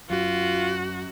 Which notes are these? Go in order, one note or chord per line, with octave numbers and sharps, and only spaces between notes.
F#2 F#3 F4 F#4